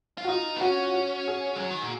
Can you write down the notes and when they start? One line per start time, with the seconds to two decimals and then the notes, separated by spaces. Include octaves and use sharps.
0.18 F4
0.24 F#4
0.29 D#4 F4
0.56 B3
0.61 C#4 F#4
0.94 F#4
1.28 G#4
1.56 G#3
1.60 F#3
1.71 D#3
1.82 A#2